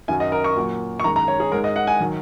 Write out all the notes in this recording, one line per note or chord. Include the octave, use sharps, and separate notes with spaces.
F#2 D#3 F#3 G#5
D#5
A#4
C#6
A#2 F#3
C#6
F#2 D#3 G#3 A#5
A#5
C#5
G#4
G#2 G#3 A#4
D#5
F#5
G#5
D#3 F#3